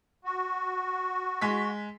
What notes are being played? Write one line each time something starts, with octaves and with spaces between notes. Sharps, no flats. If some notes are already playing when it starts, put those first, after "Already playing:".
F#4
G#3 B6